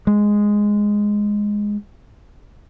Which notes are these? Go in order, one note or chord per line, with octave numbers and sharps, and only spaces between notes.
G#3